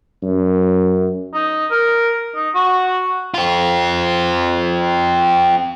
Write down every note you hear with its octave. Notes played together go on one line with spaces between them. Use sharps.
F#2
D#4
A#4
D#4
F#4
C4 F4